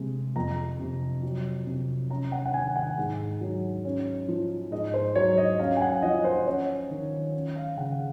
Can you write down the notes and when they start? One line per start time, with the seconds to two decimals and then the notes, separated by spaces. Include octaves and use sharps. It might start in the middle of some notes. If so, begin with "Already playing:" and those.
Already playing: C3 G#3
0.36 F2 A#5
0.79 C3
1.23 F#3
1.67 C3
2.10 C#4 A#5
2.32 F#5
2.46 F#5
2.54 D#3 G#5
2.76 F#5
2.98 G#2
3.41 F#3
3.85 C#4
4.28 F3
4.72 G#2 D#5
4.94 C5
5.15 F#3 C#5
5.38 D#5
5.59 C#4 F5
5.77 G#5
5.81 F#5
6.02 F3 D#5
6.24 C5
6.46 C#4 C#5
6.90 D#3
7.34 C#4
7.56 F5
7.77 C#3 F#5